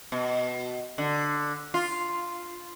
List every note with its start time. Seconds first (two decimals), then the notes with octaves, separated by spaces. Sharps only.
0.12 B2
0.98 D3
1.74 F4